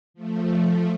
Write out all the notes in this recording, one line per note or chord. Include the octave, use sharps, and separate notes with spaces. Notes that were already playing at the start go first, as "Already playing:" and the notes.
F3 A3